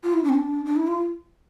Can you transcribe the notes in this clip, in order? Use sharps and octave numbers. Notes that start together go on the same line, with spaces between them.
F4
E4
D4
C4
D4
D4
E4
F4